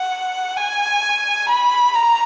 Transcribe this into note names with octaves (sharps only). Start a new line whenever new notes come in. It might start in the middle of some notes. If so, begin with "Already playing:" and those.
Already playing: F#5
G#5
B5
A#5